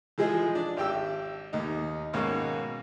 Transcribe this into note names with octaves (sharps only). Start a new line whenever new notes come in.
E3 F3 G#3 G#4 D#5
D4
G#1 G4 G5 E6
D#2 D#4
G#2 B2 D#3 A#3 C#4